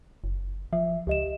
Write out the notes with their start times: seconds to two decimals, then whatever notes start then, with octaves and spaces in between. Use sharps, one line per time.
0.24 F#1
0.73 F3 E5
1.07 C#2 G4 D#5 E7